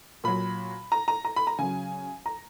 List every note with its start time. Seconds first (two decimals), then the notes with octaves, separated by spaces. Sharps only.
0.24 A#2 F#3 B5
0.92 A#5
1.08 A#5
1.25 A#5
1.36 B5
1.47 A#5
1.58 C#3 F#3 G#5
2.26 A#5